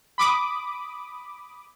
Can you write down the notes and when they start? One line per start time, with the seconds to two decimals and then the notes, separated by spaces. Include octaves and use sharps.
0.18 B5 D6 D#6